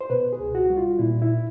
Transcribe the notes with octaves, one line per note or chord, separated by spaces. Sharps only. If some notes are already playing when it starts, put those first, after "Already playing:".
C5
B2 B4
G#4
C#2
F#4
G3
F4
A#2 E4
E4